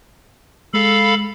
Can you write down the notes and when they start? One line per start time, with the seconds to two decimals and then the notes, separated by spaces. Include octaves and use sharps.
0.74 G#3 A4 F5 B5